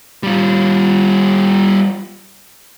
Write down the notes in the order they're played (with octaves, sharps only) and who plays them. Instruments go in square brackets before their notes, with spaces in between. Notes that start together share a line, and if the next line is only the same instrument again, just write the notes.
[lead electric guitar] G3 F4